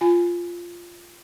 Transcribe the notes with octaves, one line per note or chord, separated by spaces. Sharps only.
F4 G#5